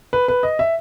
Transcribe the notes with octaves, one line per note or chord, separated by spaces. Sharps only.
B4
B4
D#5
E5